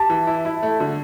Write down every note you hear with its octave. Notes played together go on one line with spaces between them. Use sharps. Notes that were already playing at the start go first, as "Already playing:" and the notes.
Already playing: G4 A5
E3
E4
E4
A3
D3